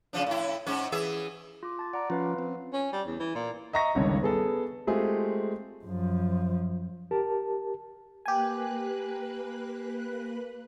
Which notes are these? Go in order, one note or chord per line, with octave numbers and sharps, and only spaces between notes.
C#3 F3 D4
A2 E4
G#2 C#4
E3 G#4 E5
F4 D6
A5 A6
D5 F#5 A#5
F3 C#4 F4 B4 F5
C4
C#4
G3
E2
E3
A#2
D#5 E5 A#5 C#6 A#6
G1 C#2 G2 D#3 C#5
B3 G#4 A4
G#3 A3 C4 F4 G4 G#4
F#2 F3
G4 A#4 A5
A#3 G4 B4 G#5 F#6